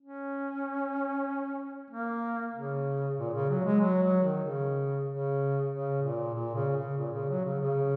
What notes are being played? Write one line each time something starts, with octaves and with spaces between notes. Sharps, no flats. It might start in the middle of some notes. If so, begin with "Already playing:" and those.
C#4
A#3
C#3
A#2
C#3
F#3
G#3
F#3
F#3
D#3
C#3
C#3
C#3
A#2
A#2
C#3
C#3
A#2
C#3
F#3
C#3
C#3